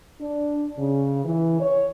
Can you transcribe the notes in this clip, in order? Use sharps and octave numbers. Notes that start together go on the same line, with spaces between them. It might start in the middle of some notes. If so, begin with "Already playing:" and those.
D4
C#3
E3
C#5